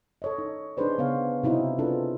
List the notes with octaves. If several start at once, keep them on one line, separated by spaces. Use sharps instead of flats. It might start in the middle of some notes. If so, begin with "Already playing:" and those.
A4 C#5 D#5
D#4
D4 D#4 G#4 B4 C5 D5
C#3 B3 C#5 F5
C3 C4 D#4 E4 F#4
C4 D4 F4 G#4 A4 B4